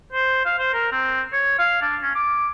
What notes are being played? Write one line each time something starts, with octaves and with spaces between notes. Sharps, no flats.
C5
F5
C5
A#4
C4
C#5
F5
D4
C#4
D6